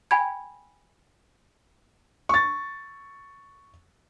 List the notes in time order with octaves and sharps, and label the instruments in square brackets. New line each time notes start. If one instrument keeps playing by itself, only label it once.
[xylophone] G5 G#5 B5 G#6
[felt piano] C#6 A6